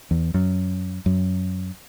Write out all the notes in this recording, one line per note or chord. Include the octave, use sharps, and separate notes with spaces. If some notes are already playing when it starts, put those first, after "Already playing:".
E2
F#2
F#2